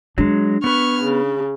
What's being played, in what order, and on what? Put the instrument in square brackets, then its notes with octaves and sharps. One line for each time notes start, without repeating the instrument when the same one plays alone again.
[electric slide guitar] F#3 G#3 [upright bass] D4
[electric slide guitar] B3 B4 [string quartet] C#6 F6 G#6
[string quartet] C#3